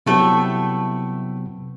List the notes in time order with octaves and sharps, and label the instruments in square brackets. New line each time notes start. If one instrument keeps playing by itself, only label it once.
[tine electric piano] C3 F#3 B3 [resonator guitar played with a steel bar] G3 A3 E4